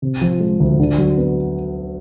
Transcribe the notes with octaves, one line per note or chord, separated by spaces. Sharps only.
C3
F3
G#3
D2
D3
F#3
B3